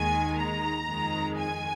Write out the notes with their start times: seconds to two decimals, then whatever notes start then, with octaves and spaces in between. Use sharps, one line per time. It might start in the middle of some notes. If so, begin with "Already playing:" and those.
Already playing: D#2 D#3 G#3 G#5
0.38 A#5
0.86 F2 D#3 G#3
1.36 G#5